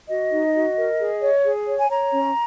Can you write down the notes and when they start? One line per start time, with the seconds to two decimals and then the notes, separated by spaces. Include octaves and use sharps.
0.09 F#4 D#5
0.32 D#4
0.55 F#4
0.77 A#4
0.99 G#4
1.22 C#5
1.44 G#4
1.67 C#5
1.79 G#5
1.89 C#5 A#5
2.12 C#4